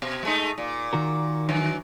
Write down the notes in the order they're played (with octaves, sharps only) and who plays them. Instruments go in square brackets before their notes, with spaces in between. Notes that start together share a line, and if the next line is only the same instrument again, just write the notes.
[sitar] B2
G#3 A3 D#4
A#2
[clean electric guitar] D#3 F#4 A#4
[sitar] D3 E3 F#3